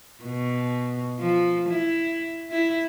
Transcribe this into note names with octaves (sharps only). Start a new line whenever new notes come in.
B2
F3
E4
E4